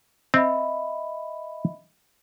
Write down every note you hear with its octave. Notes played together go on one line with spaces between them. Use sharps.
C4 D#5 E5 B5